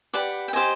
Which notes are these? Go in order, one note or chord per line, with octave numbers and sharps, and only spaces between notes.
G4 B4 D5 F#5
G5
G4 C5 D#5 G#5